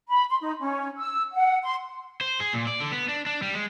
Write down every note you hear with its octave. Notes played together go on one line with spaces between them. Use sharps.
B5
C6
D#4
C#4
E6
F#5
C6
C5
G#4
A#2
D5
D3
B3
D4
D4
G3
G#3